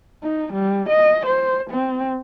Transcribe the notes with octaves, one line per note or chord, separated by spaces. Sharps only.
D#4
G3
D#5
C5
C4